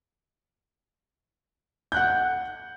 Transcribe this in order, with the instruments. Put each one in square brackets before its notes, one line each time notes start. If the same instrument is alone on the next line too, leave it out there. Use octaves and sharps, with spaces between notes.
[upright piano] F#5 F#6 G6